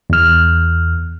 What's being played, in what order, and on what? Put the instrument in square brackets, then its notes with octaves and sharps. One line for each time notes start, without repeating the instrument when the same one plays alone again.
[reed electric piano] E2 F6